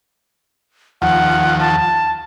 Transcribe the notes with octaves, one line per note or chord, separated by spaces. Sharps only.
D#2 F3 F#5
A5